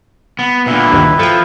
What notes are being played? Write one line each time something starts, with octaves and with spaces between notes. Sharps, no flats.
B3
A#2 D3 E4 B4
D2 G2 D#3
F3 A4 G5